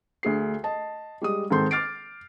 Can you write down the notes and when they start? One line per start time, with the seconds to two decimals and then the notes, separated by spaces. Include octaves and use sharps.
0.23 D2 G#4 C7
0.64 D#5 A5
1.21 G3 G#3 D#6
1.51 G#2 D#3 C4 A4 C6 G6
1.71 D6 F6 A6 C7 D7